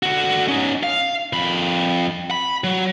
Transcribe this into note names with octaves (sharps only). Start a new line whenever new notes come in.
D3 F#4
C#4 D#4
F5
F2 B5
B5
F#3